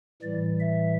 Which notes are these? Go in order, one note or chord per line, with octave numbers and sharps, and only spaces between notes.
A2 E3 G3 D5
E5